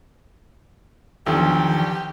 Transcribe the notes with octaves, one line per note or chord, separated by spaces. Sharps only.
B1 E2 D#3 F3 D4 G4